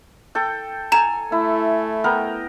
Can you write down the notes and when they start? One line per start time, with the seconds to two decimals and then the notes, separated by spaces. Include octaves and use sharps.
0.35 A4 G5
0.92 A4 G#5 A#5 E7
1.32 A3 E4
2.04 B3 A#4 G5